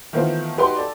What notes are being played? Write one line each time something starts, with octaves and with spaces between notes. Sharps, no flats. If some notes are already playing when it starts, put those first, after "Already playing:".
D#3 E3 A3 B3 C4 F4
D#4 F#4 G4 B4 G5 C6
A4 D5